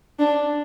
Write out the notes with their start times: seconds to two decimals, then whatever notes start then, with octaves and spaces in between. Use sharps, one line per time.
0.19 D4